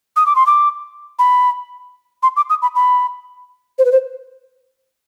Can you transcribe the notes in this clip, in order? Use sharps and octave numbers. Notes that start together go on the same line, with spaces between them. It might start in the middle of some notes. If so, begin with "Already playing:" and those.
D#6
D6
C6
D6
B5
C6
D6
D#6
B5
B5
C5
B4
C5